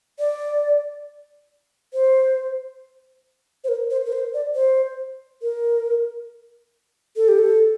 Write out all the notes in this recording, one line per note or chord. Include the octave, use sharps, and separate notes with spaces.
D5
C5
C5
A#4
C5
A#4
C5
D5
C5
A#4
A4
G4
A4